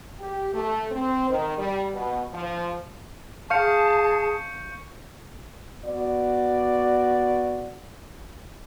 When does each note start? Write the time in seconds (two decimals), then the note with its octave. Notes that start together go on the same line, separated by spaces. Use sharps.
0.19 G4
0.53 A3
0.91 C4
1.28 D#3
1.58 G3
1.92 B2
2.33 F3
3.50 G#4 F5 A5 C#6 G6 C#7
5.86 B3 F#4 D5